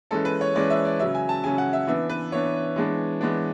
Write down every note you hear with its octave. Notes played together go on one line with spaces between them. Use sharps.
E3 G#3 C#4 A4
B4
C#5
E3 G#3 C#4 D5
E5
D5
C#3 F#3 C#4 E5
G#5
A5
C#3 F#3 C#4 G#5
F#5
E5
E3 B3 D4 E5
B4
E3 B3 D4 C#5
E3 G#3 B3 D4
E3 G#3 B3 D4